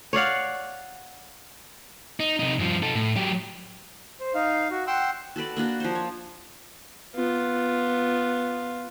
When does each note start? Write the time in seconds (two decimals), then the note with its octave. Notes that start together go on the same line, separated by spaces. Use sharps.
0.13 C#5 D5 F5 F#5
2.20 D#4
2.39 C3 D#4
2.59 G2 F3
2.82 D#4 A4
2.95 A2
3.16 F#3 G4
4.20 C5
4.34 D#4 F5
4.71 F#4
4.87 F#5 G5 C6 E6 F#6
5.36 F#4 A4 B4 D5
5.57 A#3 D4 F#4
5.80 F3 C5
5.95 C#5
7.15 B3 F4